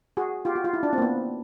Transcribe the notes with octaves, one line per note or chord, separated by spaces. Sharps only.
F#4 G#4
F4 G4
F#4
F4
E4
D4
C4
A#3
B3